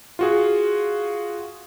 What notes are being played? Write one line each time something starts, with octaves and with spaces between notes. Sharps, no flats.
F4 F#4 G#4